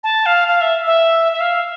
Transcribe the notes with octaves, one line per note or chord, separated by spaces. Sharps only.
A5
F5
F5
E5
E5
E5
F5